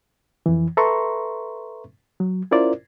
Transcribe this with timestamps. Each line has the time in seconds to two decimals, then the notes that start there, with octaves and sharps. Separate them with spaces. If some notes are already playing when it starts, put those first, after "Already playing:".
0.46 F2 E3
0.77 A4 B4 E5 A#5 C6 C#6
2.20 F#3
2.51 C#4 E4 F4 A#4 C5 D5